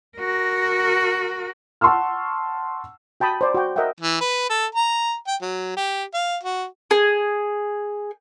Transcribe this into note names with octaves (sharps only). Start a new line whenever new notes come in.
F#4 A#4
F#5 A5 C6 C#6 E6 F6
F#4 G5 A5 B5 D#6
C5 D5
F#4 G5
A#4 D#5 E5 F#5 G5
E3
B4
A4
A#5
G5
F#3
G4
F5
F#4
G#4